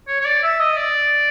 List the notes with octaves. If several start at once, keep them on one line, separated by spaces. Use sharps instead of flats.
C#5
C#5
D5
E5
D#5
D5